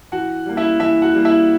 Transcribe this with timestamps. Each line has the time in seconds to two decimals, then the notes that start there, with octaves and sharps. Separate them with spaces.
0.12 E3 F#4 F#5
0.46 G3 A#3
0.57 E4 E5
0.80 E3 E4 E5
1.02 F#4 F#5
1.14 G3 A#3
1.25 E4 E5